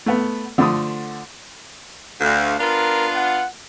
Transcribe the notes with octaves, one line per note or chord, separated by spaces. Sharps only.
A3 B3
D3 F3 A3 C6 D#6
D2 F5
B3 D4 F4 A#4
F#5